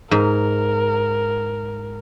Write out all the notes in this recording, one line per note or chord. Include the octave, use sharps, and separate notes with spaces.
G#2 A#4